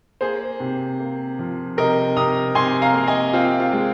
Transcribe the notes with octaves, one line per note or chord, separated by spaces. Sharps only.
A#3 G#4 C5
C3
A#3
F3
C3 A#4 D#5
C3 A#5 D#6
C3 G#5 C6
F5 A#5
A#3
D#5 G#5
C4 F4
F4
G#3